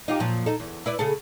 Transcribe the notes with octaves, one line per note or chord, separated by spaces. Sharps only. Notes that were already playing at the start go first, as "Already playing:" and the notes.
D#4 F4 G4
F#2 A#2 F3
D#4 A4
E2
E4 B4 D5
C#3 G#4 A4